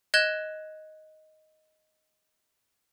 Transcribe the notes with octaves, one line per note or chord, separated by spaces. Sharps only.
D#5 F#6 G#6 E7 G7